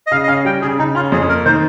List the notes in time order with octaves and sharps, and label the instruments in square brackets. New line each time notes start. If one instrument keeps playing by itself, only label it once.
[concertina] D#5
[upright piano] C#3 [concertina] F5
[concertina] D#5
[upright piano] C#4 [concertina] F5
[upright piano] G3 [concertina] G5
[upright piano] C#3 [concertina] G#4
[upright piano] C#3 [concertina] D#4
[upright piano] C#4 [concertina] F4
[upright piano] F2 [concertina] G#4
[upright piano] A#3 [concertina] A#4
[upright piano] D#3 [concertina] C5